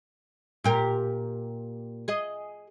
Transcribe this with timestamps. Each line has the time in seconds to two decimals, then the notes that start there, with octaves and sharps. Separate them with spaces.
0.64 A#2 G4 A#4
2.08 G#4 D#5